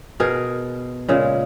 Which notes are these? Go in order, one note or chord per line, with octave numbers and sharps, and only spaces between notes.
B2 G#4 A#4
A#2 C#3 G#3